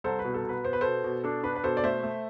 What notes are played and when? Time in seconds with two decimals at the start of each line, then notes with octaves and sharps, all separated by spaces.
0.04 C2 A4 C5
0.19 B4
0.24 B2
0.34 A4
0.44 B2 B4
0.64 B3 C5
0.73 B4
0.81 B2 A4 C5
1.04 B2
1.24 D4 A4
1.43 D4 B4
1.56 B4
1.63 B2 A4 C5
1.77 D5
1.83 A3 C5 E5
2.03 A3